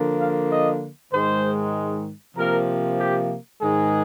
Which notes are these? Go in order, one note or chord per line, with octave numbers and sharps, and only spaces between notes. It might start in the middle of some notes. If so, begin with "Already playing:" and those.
Already playing: D3 F3 A#3
F5
D#5
G#2 D#3 G#3 C5
C3 F3 A#3 A#4
G4
G#2 D#3 G#3 G#4